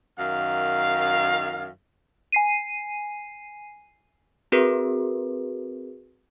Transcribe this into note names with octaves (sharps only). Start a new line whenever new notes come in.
F#2 D#3 F5
G#5 C7 D#7
C4 F#4 G#4 A#4 B4